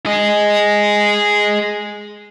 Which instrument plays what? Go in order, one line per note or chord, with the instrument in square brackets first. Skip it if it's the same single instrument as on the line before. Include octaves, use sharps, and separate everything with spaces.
[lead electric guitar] G#4 D#5